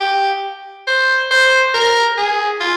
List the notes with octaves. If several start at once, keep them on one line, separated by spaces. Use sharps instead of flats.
G4
C5
C5
A#4
G#4
F4